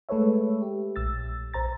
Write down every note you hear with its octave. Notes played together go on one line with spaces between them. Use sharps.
G#3 A3 A4 B4 C#5 E5
G4
A#1 E6 A6
A#1 C5 A#5 A6